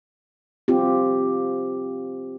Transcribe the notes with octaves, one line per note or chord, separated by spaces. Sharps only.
C4 F4 G4